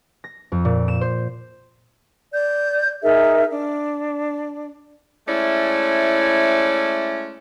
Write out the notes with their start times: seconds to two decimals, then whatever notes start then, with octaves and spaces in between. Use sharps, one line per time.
0.24 A#6
0.52 F2
0.65 A#2
0.88 E7
1.01 C5
2.32 D5 G6
3.03 D#4 G#4 A#4 E5
3.51 D4
5.28 G#3 A3 C#4 E4 D5